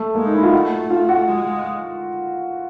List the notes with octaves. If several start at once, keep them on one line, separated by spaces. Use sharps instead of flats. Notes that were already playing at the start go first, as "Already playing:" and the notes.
Already playing: A3
G#3 A#3
D#4
E4
F4
A3 F#4
F4
F#4
G#3